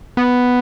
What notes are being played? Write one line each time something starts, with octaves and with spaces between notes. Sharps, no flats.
B3